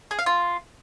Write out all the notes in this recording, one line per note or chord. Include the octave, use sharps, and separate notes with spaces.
G#4
F5
F4